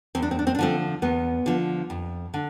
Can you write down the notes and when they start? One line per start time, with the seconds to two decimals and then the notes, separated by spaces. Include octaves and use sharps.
0.15 E2 C4
0.22 D4
0.31 C4
0.39 D4
0.47 C4
0.55 D4
0.59 D3 F3 A3 C4
1.02 E2 B3
1.46 D3 F3
1.90 F2
2.34 D3